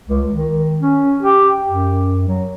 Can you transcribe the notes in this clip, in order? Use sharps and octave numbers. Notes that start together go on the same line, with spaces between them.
C#2
D#3
C#4
G4
F#2
F#3